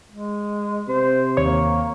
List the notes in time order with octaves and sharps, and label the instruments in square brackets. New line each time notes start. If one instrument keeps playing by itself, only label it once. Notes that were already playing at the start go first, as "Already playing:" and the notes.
[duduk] G#3
[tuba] C3 [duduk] C5
[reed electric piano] D#2 C#5 C#6 [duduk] A#3